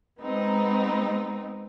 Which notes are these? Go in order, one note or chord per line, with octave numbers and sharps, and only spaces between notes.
G#3 B3 C4 D#4